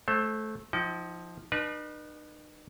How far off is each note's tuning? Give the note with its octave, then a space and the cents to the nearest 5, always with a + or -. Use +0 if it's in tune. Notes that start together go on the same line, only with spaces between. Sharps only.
A3 -15 C5 +20
F3 +0 D#4 +35 G5 -35
D#4 -45 B4 -35 A5 -30